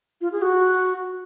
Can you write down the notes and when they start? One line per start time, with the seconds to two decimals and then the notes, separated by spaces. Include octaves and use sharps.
0.21 F4
0.32 G#4
0.42 F#4